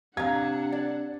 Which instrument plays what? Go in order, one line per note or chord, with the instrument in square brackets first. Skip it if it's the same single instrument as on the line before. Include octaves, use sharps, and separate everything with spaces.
[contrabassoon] C3 [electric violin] D4 F#5 [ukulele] F5 A#5 [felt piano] G#6
[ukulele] D5